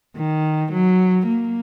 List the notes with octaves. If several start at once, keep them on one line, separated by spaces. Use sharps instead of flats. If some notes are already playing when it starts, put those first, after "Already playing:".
D#3
F#3
A#3